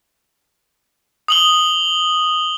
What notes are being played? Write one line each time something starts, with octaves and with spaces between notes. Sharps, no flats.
D#6 F#7 G7